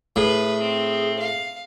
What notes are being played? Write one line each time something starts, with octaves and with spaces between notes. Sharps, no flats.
A2 G#4 B4
C4
F5